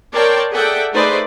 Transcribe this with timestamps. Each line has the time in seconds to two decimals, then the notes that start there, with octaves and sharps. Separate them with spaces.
0.14 A#4 C#5 D5 G5 A5 C6
0.53 G#4 A4 D5 E5 F#5 G5
0.92 A3 D#4 G#4 B4 C5 D5